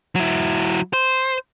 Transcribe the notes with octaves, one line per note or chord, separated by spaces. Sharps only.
F#3 E4
C5